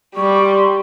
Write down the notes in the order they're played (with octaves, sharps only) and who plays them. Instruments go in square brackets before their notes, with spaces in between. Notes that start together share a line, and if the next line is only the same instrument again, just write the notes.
[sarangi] G3 [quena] C#6
[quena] C6